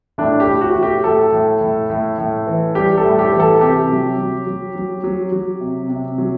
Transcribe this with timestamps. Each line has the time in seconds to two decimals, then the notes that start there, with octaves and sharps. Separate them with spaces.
0.18 A2 D4
0.40 G4
0.47 A2
0.61 F#4
0.76 A2
0.83 G4
1.04 A2 A4
1.32 A2
1.61 A2
1.90 A2
2.18 A2
2.47 E3
2.75 G3 G4
2.97 A4
3.04 A2
3.19 G4
3.32 E3
3.40 A4
3.61 C3 G4
3.89 F#3
4.18 F#3
4.47 F#3
4.75 F#3
5.04 F#3
5.32 F#3
5.61 C3
5.89 C3
6.18 F#3